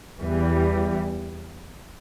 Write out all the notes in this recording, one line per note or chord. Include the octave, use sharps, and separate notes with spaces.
E2 E3 G3